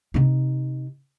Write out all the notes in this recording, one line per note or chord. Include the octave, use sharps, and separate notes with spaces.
C3 D#4